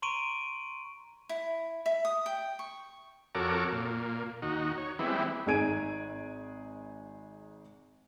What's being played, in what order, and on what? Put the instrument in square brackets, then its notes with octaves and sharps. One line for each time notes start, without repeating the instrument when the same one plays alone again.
[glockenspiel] A#5 C6 C#6 D7 D#7
[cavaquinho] E4
E5
D#6
G5
C#6
[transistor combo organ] F2 F#4 A4 A#4 C#5 D6
A#2
D#2 D#4 F#4
C#5
E3 G3 G#3 B3 C4 E4
[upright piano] G#1 D#4 G#4 G#6 D7 D#7